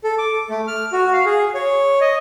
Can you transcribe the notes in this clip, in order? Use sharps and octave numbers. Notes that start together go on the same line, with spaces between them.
A4
D6
A3
F6
F#4
F5
G#4
C#5
D#5